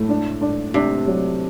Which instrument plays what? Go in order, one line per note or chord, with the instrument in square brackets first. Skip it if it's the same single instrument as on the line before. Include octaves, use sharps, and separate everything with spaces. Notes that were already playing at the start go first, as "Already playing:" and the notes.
Already playing: [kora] A2 [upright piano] A3
[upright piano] D4
D4
[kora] C3 [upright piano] D4
[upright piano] F#3